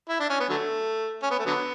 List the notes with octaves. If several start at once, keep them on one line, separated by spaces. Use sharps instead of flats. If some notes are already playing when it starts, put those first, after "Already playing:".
E4
D4
C#4
B3
D3 F#3 A3
C#4
B3
A3
D3 F#3 B3